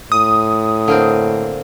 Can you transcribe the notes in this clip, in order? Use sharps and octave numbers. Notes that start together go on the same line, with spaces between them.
A2 D#6
D3 A#3 C4